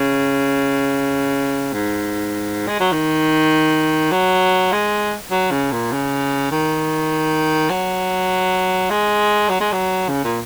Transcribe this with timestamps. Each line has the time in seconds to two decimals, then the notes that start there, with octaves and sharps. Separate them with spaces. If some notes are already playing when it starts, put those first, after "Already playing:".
Already playing: C#3
1.73 G#2
2.68 G#3
2.80 F#3
2.92 D#3
4.11 F#3
4.72 G#3
5.31 F#3
5.51 C#3
5.72 A#2
5.92 C#3
6.51 D#3
7.70 F#3
8.90 G#3
9.49 F#3
9.60 G#3
9.72 F#3
10.08 C#3
10.25 A#2